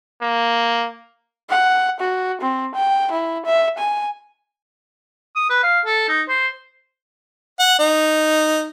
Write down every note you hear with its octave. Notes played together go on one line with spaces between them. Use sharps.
A#3
F#5
F#4
C4
G5
E4
E5
G#5
D#6
B4
F5
A4
D#4
C5
F#5
D#4